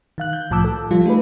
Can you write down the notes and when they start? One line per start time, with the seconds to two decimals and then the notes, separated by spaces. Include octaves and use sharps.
0.18 D#3 F5 F#6
0.33 G6
0.50 C2 A2 F3 A5 D6 E6
0.65 A4
0.91 F3 G3 F4
1.06 A3 D#4 G#4 B4